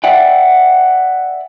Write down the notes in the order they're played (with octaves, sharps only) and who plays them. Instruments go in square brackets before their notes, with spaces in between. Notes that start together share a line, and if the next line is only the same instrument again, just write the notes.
[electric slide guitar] D5 E5 F#5 G5